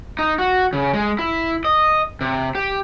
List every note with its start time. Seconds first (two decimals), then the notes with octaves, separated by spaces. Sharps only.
0.19 D#4
0.39 F#4
0.73 C#3
0.93 G#3
1.19 E4
1.65 D#5
2.21 C3
2.55 G4